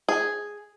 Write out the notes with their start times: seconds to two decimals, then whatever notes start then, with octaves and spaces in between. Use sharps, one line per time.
0.09 G#4